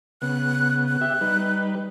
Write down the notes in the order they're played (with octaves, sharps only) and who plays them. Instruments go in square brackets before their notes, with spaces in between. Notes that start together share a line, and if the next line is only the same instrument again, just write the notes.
[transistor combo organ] C#3 B3 [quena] F#6
[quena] F#6
[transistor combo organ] G4 E5
G3 D#4 B4